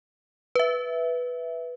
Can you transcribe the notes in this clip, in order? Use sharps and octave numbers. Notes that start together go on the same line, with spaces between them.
B4 E5